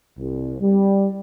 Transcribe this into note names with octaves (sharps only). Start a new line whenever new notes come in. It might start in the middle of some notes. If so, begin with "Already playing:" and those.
C2
G3